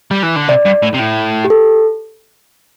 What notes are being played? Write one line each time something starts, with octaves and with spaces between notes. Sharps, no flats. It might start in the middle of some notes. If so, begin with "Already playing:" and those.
G3
E3
D3
C3 D5
G2
A2
C3
A2
G4
A4